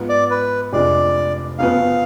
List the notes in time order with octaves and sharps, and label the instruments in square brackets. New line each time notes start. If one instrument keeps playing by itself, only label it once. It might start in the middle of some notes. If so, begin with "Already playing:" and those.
Already playing: [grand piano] G#2 F3 B3
[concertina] D5
B4
[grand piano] F1 F2 F3 G#3 D4 [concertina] D5
[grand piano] F#2 C#3 F3 B3 [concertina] F5